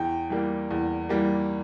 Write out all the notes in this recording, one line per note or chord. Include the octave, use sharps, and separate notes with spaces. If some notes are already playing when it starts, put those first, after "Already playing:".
Already playing: E2 G5
E3 G3 A#3
E2
E3 G3 A#3